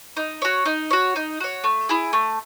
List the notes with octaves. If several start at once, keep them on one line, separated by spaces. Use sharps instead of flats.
D#4
F#4 C#5
D#4
F#4 C#5
D#4
F#4 C#5
A3
E4 G#4
A3